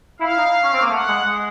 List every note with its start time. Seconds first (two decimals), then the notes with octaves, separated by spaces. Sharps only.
0.20 E4 F5
0.38 D#4
0.63 C#4
0.73 C4
0.81 A#3
0.90 A3 F#5
1.08 G#3
1.26 G#3